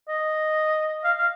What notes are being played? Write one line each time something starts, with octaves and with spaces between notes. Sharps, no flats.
D#5
F5
F5